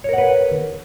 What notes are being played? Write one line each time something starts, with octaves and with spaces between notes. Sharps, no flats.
A#4 B4 C#5 F#5